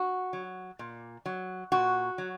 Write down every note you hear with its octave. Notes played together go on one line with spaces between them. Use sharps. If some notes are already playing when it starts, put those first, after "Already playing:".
Already playing: F#4
F#3
A#2
F#3
A#2 F#4
F#3